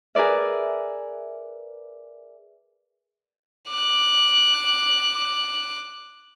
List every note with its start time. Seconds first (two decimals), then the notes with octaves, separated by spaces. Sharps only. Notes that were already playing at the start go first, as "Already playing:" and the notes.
0.15 G#4 A#4 B4 D5 E5
3.70 D6 F#6